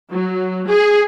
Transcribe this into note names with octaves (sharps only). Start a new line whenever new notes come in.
F#3
G#4